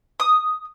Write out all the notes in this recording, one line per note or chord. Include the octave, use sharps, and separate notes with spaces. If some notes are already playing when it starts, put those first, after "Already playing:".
D#6